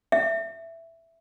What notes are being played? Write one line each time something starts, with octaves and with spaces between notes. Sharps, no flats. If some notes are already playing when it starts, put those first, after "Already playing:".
E5